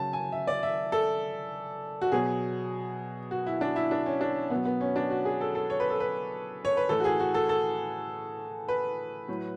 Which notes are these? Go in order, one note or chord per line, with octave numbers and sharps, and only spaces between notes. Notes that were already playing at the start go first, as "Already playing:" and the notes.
Already playing: C#3 F#3 A5
G#5
E5
D5
E5
A4
F#4
B2 F#3 G#4
F#4
E4
D4
E4
D4
C#4
D4
B2 F#3 B3
B3
C#4
D4
F#4
G#4
A4
A4
C#5
B4
A4
B4
C#5
B4
A2 E3 A4
F#4
G#4
F#4
A4
A4
B4
A2 F#3